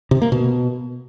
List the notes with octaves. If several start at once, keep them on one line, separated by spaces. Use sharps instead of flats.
C3
A#3
B2